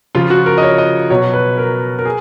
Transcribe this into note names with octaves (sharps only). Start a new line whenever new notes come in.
C#3 F3 F4
F#4
A#4
D#5
C#5
D#5
B2 F#3 C#5
B4
A#4
A#4
G#4